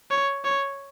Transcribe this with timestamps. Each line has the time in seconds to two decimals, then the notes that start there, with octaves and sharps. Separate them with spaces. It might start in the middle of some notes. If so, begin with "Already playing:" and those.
0.11 C#5
0.44 C#5